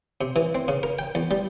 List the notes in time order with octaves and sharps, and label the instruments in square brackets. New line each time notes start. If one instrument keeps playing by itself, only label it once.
[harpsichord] C3
E3
C4
C#3
A#4
G5
E2
G3